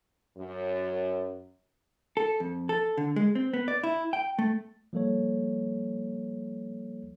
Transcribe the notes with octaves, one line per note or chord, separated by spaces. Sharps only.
F#2
A4
F2
A4
D3
G#3
C4
B3
D5
E4
G5
A3
F3 G3 A#3 A4 C#5